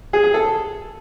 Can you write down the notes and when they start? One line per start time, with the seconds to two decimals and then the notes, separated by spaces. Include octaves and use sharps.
0.13 G#4
0.24 G#4
0.34 A4